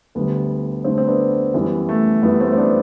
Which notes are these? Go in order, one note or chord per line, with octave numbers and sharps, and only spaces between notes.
D2 D3 G3 B3
D2 D3 G3 A3 C4
C4
B3 D4
F#2 E3 G3 B3
A3
F#2 E3 G3 B3
A3 C4
C4
B3 D4